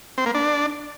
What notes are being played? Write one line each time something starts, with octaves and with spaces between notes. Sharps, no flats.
C4
A#3
D4